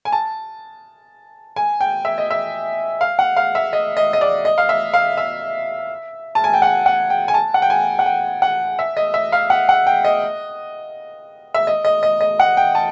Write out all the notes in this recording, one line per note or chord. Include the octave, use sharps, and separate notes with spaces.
G#5
A5
G#5
G5
E5
D#5
E5
F5
F#5
F5
E5
D#5
D#5
D#5
D5
D#5
F5
E5
F5
E5
A5
G#5
G5
F#5
F#5
G5
G#5
A5
F#5
G5
G#5
F#5
G5
F#5
E5
D#5
E5
F5
F#5
F#5
G5
D#5
E5
D#5
D#5
D#5
D#5
F#5
G5
A5